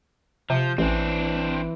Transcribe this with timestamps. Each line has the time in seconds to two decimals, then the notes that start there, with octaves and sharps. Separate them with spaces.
0.50 C3 F3 G6
0.78 A1 E3 C4 D4